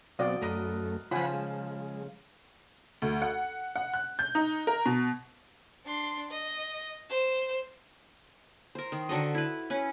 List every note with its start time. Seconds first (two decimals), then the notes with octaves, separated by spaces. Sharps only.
0.19 B2 F#3 C4 F#4 D5 D#5 F5
0.41 F#2 A3 A#4 B4 D#5
1.11 C#3 F3 F4 C5 F#5 G#5 B5
1.33 G#3
3.02 D2
3.22 F#5
3.76 F#5
3.94 F#6
4.19 G6
4.35 D#4
4.67 A#4
4.86 B2
5.86 D4 C6
6.31 D#5
7.10 C5 E7
8.75 A#4 C5
8.92 D#3
9.09 D3 F#4 A4 D#5
9.35 E4 B4
9.70 C#4 B4